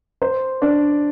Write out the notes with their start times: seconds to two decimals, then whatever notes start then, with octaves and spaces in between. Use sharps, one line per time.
0.22 C5
0.62 D4